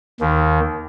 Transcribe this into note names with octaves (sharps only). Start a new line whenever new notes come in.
D#2 D#3